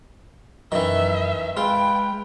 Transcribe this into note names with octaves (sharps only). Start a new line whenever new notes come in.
F#2 D#3 E3 E5
G#3 F4 B4 G5